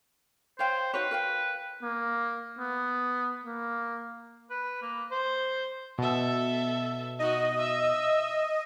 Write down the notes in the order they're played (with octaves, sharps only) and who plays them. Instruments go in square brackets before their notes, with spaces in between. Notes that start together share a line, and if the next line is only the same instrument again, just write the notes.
[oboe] C5 [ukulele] C#5 F5 G5
[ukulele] D#4 F#4 C#5 [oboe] B4
[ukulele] A#4 F5 G5
[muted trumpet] A#3
B3
A#3
[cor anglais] B4
A#3
C5
[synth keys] B2 [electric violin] A4 E5
[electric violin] D#4 F#4 [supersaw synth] D#5
[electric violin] E5 E6